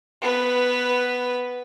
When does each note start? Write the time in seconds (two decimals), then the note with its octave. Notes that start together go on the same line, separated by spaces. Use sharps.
0.22 B3 B4